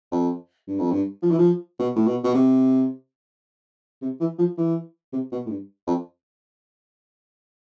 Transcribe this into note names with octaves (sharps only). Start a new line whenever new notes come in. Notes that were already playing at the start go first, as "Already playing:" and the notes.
F2
G2
F2
G2
F3
E3
F3
B2
A2
B2
B2
C3
C3
E3
F3
E3
C3
B2
A2
G2
F2